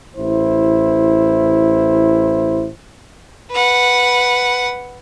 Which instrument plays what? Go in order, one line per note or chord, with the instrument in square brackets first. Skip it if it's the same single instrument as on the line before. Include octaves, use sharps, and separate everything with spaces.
[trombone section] A1 E4 C5
[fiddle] B4 F#5